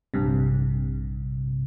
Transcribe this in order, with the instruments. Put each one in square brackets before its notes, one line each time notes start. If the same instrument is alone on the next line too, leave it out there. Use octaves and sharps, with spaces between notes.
[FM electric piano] A#1 G2 C3